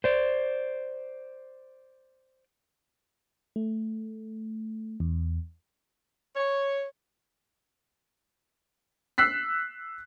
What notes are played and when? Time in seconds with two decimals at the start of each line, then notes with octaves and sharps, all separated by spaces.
0.04 C5 D5
3.56 A3
5.00 E2
6.36 C#5
9.18 E6 F#6 B6 C7